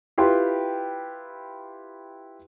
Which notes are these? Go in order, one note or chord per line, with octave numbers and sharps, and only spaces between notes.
E4 F4 G4 B4 G5 C6